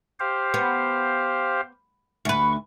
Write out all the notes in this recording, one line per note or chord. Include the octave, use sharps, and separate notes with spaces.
G4 C5 F5
B3
D2 B4 C#6